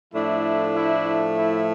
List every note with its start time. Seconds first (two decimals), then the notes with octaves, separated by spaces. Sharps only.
0.12 A2 F3 A3 D4 E4
0.74 E4
1.36 E4